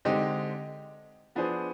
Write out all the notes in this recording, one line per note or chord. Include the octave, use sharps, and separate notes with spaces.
D3 G#3 C4 D#4 G4
F3 B3 D4 G#4 C5